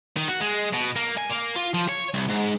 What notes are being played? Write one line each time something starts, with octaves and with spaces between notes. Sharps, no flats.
D#3
F#4
G#3
B2
A#3
G#5
A#3
F4
F3
C#5
C2
G#2